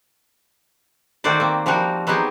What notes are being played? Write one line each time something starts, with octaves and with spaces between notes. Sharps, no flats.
D#3 A3 F#4 C5 D5
A#3 C4
F3 G3 D#4 F#4 A#4
F#3 B3 C4 D#4 G4 G#4